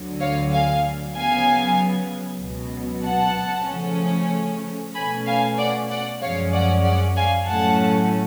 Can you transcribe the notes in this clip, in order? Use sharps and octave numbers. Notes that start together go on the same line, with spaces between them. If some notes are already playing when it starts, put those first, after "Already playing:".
Already playing: D2 D3 F#3
C#5 F5
F5 G#5
C#3 F#3 B3 F5 G#5
C#2 B2 F#3
F#5 A5
C#3 F3 A3 C#4
B2 A3 C#4 G#5 B5
F5 G#5
D5 F#5
D5 F#5
F#2 F3 G#3 C#4 C#5 F5
D5 F#5
D5 F#5
F5 G#5
A2 F#3 A3 C#4 F#5 A5